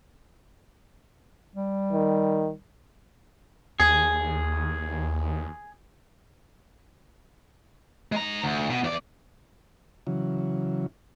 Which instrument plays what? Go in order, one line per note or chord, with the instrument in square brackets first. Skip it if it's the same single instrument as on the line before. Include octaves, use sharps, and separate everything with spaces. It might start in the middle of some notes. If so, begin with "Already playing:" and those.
[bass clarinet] G3
[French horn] D#3
[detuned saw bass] D#2 [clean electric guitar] G#4
[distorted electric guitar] G#3 A#5
D2
B2
E2 D5
[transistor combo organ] C#3 E3 F#3